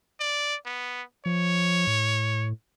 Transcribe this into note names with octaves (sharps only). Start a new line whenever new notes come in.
D5
B3
F3 C#5
A2